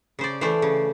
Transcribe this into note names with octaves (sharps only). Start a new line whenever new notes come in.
C#3 C5 D5
E3 A3 C5 D5
C#3